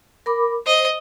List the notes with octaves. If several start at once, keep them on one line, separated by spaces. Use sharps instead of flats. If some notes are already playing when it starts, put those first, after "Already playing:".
A#4 B5 D6
C5 D#5